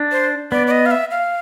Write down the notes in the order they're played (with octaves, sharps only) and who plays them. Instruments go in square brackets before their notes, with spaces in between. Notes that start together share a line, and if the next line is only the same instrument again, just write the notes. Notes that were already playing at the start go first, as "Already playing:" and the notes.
Already playing: [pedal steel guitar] D4
[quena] C5
[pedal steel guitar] B3 [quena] D5
[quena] D5
D#5
F5
E5
F5